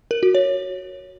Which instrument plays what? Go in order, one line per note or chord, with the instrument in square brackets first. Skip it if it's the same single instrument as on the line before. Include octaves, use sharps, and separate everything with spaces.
[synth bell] A#4
F#4
C#5